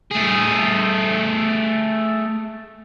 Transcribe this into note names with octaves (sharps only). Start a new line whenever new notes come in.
A3 G#4